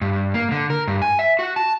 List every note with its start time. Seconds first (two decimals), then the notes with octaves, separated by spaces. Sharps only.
0.01 G2
0.34 A#3
0.51 D3
0.70 A#4
0.87 G2
1.02 G#5
1.19 E5
1.39 F#4
1.56 A5